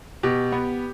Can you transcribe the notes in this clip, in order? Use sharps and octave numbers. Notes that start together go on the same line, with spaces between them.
B2 G4
B3